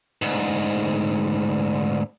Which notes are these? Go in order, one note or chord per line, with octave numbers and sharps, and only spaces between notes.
D2 G#2